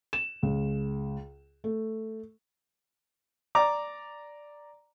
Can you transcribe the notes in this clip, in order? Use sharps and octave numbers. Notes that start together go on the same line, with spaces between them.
E7
C#2
A3
D5 A#5 D6